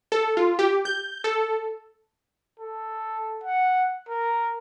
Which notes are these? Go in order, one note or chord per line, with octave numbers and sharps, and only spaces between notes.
A4
F4
G4
G6
A4
A4
F#5
A#4